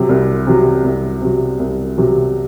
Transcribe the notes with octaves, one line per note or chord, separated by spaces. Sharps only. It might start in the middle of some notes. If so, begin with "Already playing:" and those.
Already playing: C3 F#3
C2
C3 F#3
C2
C3 F#3
C2
C3 F#3